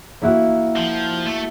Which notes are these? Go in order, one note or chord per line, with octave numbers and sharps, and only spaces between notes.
A#3 E4 F#4
F3
A3